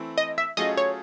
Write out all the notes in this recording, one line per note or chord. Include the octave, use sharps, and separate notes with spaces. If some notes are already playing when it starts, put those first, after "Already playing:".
Already playing: E3 A3 C4 E4
D#5
E5
F#3 A3 C#4 F4 G#4 D#5
C#5